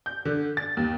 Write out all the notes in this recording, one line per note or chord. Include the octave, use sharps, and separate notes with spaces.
G6
D3
A6
D#2